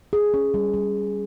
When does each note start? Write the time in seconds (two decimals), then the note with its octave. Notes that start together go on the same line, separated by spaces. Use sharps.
0.13 G#4
0.34 C#4
0.54 G3
0.74 G3